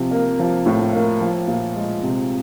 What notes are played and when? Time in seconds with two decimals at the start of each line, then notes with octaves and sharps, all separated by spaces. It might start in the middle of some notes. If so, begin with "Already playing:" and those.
Already playing: C3 F3
0.11 A#3
0.39 F3
0.66 A2
0.93 A#3
1.21 F3
1.47 A#2
1.75 G#3
2.03 C3